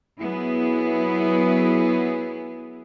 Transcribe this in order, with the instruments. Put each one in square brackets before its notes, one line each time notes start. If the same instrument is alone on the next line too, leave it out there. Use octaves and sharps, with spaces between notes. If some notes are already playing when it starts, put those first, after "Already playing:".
[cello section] F#3 B3 E4 G#4